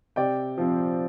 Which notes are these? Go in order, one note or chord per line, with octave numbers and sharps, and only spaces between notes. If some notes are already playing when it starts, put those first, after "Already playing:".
C3 D5 G5
F3 C4